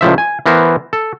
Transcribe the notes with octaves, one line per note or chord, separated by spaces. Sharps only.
C#2 A2 F3 E5
G#5
E3 B3 A#4 C5
A4